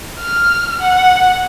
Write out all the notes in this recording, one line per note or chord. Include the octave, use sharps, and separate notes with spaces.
F6
F#5